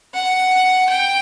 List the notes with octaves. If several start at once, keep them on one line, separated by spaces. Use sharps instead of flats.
F#5
G5